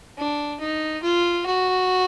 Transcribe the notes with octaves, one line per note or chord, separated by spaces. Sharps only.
D4
D#4
F4
F#4